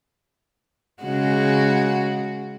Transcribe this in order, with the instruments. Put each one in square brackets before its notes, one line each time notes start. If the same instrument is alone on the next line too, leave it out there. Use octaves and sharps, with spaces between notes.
[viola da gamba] C#3 G#3 F#4